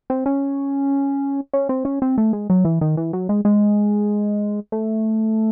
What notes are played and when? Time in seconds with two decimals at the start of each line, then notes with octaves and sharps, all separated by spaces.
0.10 C4
0.26 C#4
1.53 C#4
1.69 C4
1.85 C#4
2.02 C4
2.18 A3
2.33 G#3
2.50 F#3
2.65 E3
2.81 D#3
2.97 E3
3.13 F#3
3.29 G#3
3.45 G#3
4.72 A3